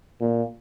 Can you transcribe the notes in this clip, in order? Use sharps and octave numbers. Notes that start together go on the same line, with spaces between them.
A#2